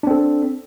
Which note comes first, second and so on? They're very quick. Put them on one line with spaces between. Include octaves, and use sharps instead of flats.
D4 C4 A4